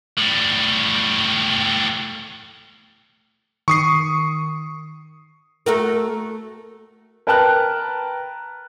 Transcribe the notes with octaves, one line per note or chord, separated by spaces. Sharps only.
A2 G3
D#3 C#6 D#6 C7
A3 F#4 A#4
A#4 B4 G5 A5 F6 F#6